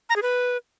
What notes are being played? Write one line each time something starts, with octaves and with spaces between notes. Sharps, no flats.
A#5
G#4
B4